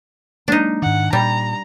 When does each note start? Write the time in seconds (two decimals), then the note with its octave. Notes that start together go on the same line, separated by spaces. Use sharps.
0.48 F#3 G#3 A#3 D4 D#4
0.82 G#2 D#3 F#5
1.13 A#2 G3 A#5